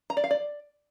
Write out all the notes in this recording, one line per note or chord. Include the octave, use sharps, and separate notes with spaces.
A#5
D5
F5
D5